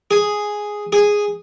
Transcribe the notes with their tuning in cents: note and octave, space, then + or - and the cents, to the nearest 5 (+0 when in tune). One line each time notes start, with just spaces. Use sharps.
G#4 +0
G#4 -5